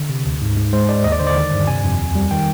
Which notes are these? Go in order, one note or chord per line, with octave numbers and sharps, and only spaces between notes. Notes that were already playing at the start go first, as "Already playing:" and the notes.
Already playing: D3
C3
D2
G#2
G#2
G#3 C5
G#3 D5
D#2 D#5
D5
D3 C5
D5
D#3
G2
C3 G#5
F2
D#2
G3
D#3 G5